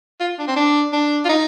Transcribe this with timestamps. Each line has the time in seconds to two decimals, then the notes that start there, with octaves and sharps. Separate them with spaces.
0.20 F4
0.39 D4
0.48 C4
0.56 D4
0.93 D4
1.25 F4
1.29 D#4